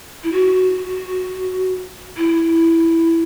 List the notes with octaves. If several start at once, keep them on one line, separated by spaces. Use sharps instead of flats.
E4
F#4
E4